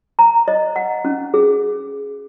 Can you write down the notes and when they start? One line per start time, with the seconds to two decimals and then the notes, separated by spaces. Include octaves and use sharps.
0.19 A#5
0.48 D#5
0.76 F#5
1.05 C#4
1.34 G#4